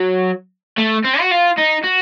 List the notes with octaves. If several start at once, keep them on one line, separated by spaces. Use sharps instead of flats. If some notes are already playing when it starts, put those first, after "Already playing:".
Already playing: F#3
A3
C4
F#4
F4
D#4
F#4